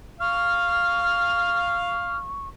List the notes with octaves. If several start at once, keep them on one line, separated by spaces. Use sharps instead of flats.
F5 C#6 F6